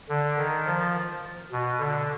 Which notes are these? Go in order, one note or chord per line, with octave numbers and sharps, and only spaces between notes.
D3
D#3
F3
B2
D3